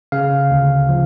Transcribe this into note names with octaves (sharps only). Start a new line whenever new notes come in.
C#3 F5
D2
F3